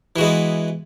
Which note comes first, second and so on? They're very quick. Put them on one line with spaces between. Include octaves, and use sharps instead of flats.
E3 F#4 G#3 B3